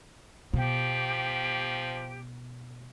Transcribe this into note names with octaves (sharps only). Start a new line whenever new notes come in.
B2 F3 G4